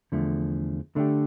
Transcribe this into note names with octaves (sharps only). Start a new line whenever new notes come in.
E2 D3 F3 A3
D3 A3 D4 G4